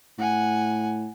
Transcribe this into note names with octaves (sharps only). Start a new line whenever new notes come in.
A2 F#5 G#5